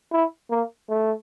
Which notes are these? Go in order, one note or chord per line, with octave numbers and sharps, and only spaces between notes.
E4
A#3
A3